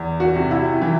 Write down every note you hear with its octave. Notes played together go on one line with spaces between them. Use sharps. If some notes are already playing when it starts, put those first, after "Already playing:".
Already playing: E2
F#4
C3
E4
E3